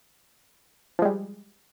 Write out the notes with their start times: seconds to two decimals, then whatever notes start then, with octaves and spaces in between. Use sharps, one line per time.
0.99 F3
1.02 G#3
1.05 G3